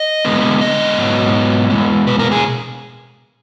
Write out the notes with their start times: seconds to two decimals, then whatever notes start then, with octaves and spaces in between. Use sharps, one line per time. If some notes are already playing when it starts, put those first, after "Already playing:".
Already playing: D#5
0.25 D3 G#3 B3
0.61 D#5
0.98 G#2 F#3 B3
1.70 B2 G#3 B3
2.07 B4
2.19 A#4
2.31 G#4